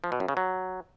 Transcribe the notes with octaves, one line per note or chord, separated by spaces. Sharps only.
F3
B2
F#2
C#3
F#3